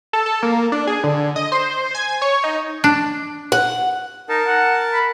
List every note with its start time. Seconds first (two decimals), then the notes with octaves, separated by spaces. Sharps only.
0.13 A4
0.26 A4
0.43 A#3
0.72 D4
0.87 G#4
1.03 D3
1.36 D#5
1.52 C5
1.95 G#5
2.22 C#5
2.44 D#4
2.84 D4
3.52 F#5
4.29 D#4 A#4 A5
4.47 F#5
4.94 B5